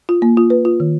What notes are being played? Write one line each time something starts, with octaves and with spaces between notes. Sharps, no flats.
F4
A#3
F4
B4
F4
D#3